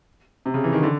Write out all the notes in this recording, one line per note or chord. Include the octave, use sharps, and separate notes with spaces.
C3
C#3
E3
D#3
D3